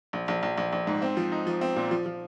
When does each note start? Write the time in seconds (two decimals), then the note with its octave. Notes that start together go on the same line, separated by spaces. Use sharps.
0.13 A#1
0.28 A#1
0.43 A#1
0.58 A#1
0.73 A#1
0.87 G#2
1.02 C4
1.17 F3
1.32 D#4
1.47 F3
1.61 C4
1.76 A#2
1.91 F3
2.06 F3